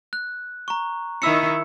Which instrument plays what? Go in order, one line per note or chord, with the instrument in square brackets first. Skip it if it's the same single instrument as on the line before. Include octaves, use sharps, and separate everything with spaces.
[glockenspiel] F#6
A#5 C#6
[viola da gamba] D#3 D#4 E4 [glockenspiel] E6 C#7